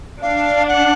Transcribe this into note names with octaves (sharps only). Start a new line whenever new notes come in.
D4 F5
F#5